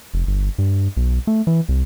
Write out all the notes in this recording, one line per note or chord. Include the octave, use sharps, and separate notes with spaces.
F1
G1
G2
B1
A3
E3
C2